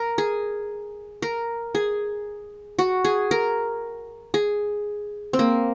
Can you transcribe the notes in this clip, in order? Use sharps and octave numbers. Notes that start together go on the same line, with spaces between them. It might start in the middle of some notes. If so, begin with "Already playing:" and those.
Already playing: A#4
G#4
A#4
G#4
F#4
G#4
A#4
G#4
C4
A#3